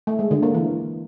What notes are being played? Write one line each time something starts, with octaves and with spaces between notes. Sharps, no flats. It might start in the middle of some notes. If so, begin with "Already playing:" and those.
A3
G#3
D3
A#3
E3